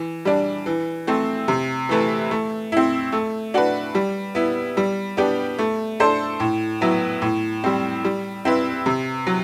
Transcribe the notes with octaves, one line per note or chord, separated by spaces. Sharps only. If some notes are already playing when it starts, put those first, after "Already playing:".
Already playing: E3
G3 D4
E3
A3 C4
C3
E3 A3 E4 B4
A3
C4 E4
A3
D4 F#4 B4
G3
B3 E4
G3
B3 D4 G4
A3
D4 A4 C5
A2
F#3 B3 E4
A2
G3 C4
G3
C4 E4 B4
C3
F#3